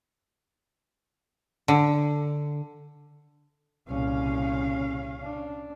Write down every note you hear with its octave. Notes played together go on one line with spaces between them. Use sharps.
D3
C2 A#2 C#3 C#4 F5
D4